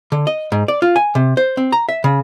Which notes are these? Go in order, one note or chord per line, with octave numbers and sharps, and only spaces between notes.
D3
D#5
G#2
D5
F4
G#5
C3
C5
C4
A#5
E5
C#3